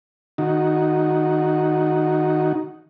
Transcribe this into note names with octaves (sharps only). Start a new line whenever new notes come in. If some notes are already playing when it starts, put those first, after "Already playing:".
D#3 D#4 F#4